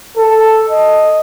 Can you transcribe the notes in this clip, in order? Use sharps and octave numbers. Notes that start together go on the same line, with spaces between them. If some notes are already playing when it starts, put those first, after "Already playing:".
A4
D#5